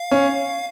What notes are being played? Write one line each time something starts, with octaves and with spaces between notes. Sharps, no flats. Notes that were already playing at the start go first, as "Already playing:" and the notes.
Already playing: F5
C#4